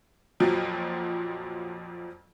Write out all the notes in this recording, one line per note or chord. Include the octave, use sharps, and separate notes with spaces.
F2 A#2 F3 F#3